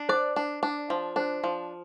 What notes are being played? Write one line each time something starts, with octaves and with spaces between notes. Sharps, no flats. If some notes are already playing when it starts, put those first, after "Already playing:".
Already playing: D4
C5 D5
D4
D4
F3
D4 C5
F3